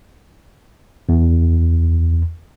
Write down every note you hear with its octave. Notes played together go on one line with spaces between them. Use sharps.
E2